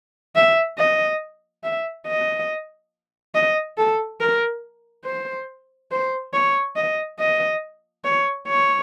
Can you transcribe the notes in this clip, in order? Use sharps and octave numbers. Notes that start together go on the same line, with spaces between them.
E5
D#5
E5
D#5
D#5
A4
A#4
C5
C5
C#5
D#5
D#5
C#5
C#5